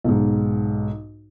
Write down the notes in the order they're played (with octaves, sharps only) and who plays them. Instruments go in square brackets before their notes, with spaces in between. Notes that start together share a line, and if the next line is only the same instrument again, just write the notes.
[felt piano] B1 G#2